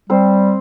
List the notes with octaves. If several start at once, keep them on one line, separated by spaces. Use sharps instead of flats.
G3 C4 C5